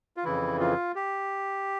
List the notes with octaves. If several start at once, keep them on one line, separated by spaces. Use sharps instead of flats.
F4
F2 C#3 E3 E4
F4
G4